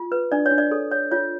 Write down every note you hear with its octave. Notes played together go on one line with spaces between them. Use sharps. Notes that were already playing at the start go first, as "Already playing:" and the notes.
Already playing: F4
B4
D4 D5
C#5
D4
D5
A4
C#5
F4 C#5